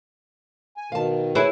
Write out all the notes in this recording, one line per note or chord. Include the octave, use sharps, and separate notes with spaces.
G#5
B2 D#3 F5 A5
E4 G#4 B4 C#5